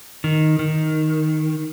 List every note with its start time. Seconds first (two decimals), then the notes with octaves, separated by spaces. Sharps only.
0.24 D#3
0.59 D#3